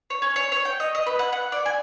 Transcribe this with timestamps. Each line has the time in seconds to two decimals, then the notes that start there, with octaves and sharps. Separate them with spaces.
0.10 C#5
0.22 C#4
0.36 C#5
0.52 C#5
0.65 G5
0.80 D#5
0.95 D#5
1.06 B4
1.19 F#5
1.33 F#5
1.52 D5
1.66 G#5